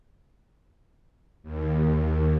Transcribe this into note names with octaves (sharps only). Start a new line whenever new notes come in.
D#2